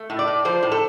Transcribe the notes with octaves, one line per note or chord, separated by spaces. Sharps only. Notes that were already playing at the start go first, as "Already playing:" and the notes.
Already playing: A3
A2
D5
A2
F3 C5
A2
A4